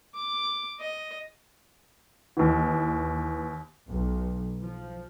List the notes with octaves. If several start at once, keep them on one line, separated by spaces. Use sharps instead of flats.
D6
D#5
D#2 E3
B1
F3